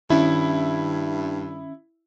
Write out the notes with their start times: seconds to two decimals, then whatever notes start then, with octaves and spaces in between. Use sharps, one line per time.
0.10 G2 D#3 C#4 E4